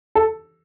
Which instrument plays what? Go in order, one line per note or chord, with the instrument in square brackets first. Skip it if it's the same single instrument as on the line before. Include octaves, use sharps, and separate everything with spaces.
[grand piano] A4